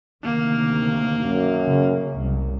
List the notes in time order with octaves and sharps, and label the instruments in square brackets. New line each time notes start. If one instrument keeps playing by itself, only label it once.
[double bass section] D2 C3 D#3 [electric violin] A#3
[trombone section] F#2
[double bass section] C#3
C2 F#2